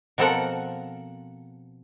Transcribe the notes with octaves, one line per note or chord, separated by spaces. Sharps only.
B2 F3 C4 A4 A#4 F#5